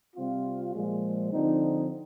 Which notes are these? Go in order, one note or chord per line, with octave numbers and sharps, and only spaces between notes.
C3 G3 C4 F4
A#2 F3 G#3
D3 F3 C4 D#4